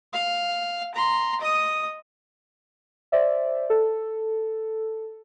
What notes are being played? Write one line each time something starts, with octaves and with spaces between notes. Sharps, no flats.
F5
A#5 C6
D#5 D#6
C5 D5 E5
A4